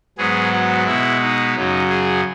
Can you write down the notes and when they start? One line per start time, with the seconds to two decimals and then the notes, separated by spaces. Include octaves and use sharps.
0.18 G#2 F#3 B3 G#4
0.52 F#4
0.86 B2 G#3 B3 E4
1.21 D#4
1.55 F#2 C#3 F#3
1.90 G#4